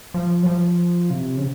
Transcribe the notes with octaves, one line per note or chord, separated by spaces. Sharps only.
F3
F#3
F3
C3
C#3